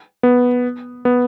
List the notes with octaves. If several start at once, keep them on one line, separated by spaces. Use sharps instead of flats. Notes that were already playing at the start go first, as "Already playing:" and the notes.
B3
B3